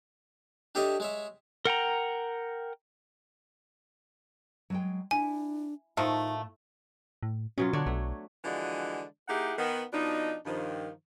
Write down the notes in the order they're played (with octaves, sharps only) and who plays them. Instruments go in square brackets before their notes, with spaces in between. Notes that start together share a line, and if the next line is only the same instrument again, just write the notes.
[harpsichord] D4 G4 A4 C#5 D#5 E5
G#3 C#5 E5
[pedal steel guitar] A#4 F#5 G5 A#5
[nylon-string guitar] F#3 G#3 G5
[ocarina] D4 [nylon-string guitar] E4 [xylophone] G#5
[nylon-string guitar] A2 [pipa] D#3 F3 A3 [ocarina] D#4
[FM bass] A2
[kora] B2 F#3 F4 [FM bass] C#4
[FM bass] D3 [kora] D4 F#4 C#5
[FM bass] B1 [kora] A3
[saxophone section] D3 E3 F3 G#3 D4 F#4
A#3 D#4 E4 G4 G#4 F#5
D#3 B3
B2 F3 D4 D#4
G2 D#3 F3